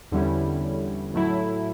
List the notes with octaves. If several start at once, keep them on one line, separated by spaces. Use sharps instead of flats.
E2 D3 G3 C#4 E4
A2 F#3 A3 E4